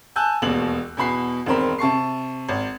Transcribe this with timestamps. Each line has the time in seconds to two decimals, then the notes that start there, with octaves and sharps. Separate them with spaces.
0.16 G#5 A5 E6 F#6 G6
0.42 E1 D#2 B2 F#7
0.97 E2 B2 B5 C7
1.46 E1 D#3 C4 A#4 B5
1.78 C3 A5 C#6 C7
2.49 G#1